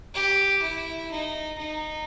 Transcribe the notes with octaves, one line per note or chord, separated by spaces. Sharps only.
G4
E4
D#4
D#4